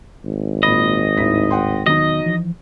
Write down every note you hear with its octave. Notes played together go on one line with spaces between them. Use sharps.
G#1
A#2 D#5 B5
D#2 A2 D#4 E4 B6
F#5 G5 C6
E1 D#3 F#3 B3 D#4 D#5
E3 F3